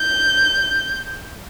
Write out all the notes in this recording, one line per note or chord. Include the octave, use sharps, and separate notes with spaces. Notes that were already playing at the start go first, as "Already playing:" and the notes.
Already playing: G6